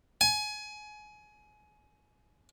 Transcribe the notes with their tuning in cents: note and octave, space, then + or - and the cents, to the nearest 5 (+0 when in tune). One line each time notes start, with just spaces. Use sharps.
G#5 +25